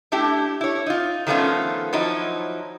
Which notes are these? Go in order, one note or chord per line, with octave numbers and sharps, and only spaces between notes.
A3 D4 E4 G4
E4 C#5
D#4 F4
D#3 F3 A3 B3 C#4 F4
F3 F#3 D#4 E4